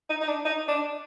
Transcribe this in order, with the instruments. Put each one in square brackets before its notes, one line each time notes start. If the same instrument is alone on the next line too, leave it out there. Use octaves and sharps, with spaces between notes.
[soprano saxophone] D#4
D#4
D4
D#4
D4